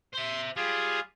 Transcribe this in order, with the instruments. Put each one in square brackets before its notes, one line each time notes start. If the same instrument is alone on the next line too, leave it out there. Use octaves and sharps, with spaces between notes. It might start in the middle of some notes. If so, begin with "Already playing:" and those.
[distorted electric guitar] C5 E5 [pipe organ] C6
[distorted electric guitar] G3 [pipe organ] F4 G#4